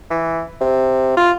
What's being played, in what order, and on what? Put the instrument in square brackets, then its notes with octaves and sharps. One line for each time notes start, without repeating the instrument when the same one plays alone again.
[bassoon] E3
C3
F4